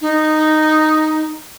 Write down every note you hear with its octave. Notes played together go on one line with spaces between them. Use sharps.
D#4